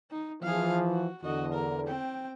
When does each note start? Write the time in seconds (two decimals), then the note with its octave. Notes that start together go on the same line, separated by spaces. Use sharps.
0.11 D#4
0.42 E3 F3 G#4 F5
0.90 F#4
1.23 E2 D3 F#4 D#5
1.53 A#4
1.87 C4 G5